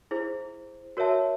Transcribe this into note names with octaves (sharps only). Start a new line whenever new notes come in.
E4 G#4 C5
F#4 A#4 C#5 E5 A5